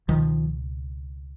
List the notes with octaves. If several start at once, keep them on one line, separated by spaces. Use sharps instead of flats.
C#2 B2 D#3 F3